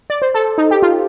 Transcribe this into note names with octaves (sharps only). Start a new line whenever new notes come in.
D5
C5
A4
D#4
G4
F4